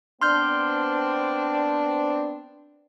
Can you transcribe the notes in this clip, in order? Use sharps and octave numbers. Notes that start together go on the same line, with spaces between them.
B3 C4 D4 C6 F6 G6